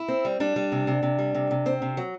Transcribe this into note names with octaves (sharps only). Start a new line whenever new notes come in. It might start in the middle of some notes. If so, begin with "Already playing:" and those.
Already playing: E4
C4
G3
G3 D4
G3
C3
C3
C3
G3
C3
C3
C4
C3
F#3